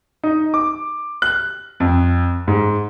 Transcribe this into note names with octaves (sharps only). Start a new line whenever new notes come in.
D#4
D6
F#6
F2
G#2